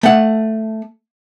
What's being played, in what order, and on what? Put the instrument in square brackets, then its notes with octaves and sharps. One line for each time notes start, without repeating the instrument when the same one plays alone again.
[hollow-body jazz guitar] A3 F#5